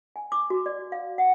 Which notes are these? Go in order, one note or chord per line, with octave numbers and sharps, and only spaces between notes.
G#5
D6
F#4
D5
F5
F#5